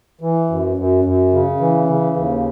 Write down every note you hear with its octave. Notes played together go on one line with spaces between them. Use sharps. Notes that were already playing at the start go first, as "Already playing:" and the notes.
E3
F#2
F#2
F#2
C#3
E3
C#3
D#2